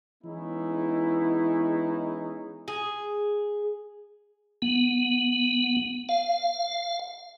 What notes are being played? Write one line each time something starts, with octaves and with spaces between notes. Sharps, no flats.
E3 G#3 B3 C#4 D#4 E4
G#4
B3
F5